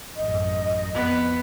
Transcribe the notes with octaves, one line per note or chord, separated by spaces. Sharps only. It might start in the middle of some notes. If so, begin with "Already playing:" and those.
A1 F#2 D#5
F2 B3